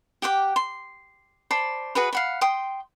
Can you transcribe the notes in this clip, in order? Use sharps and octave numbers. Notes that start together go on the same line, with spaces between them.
G4 F#5 G5 D6
C6
C5 D5 A5 B5
F#4 G#4 B4 B5
F5 F#5 B5
G5 C6 D#6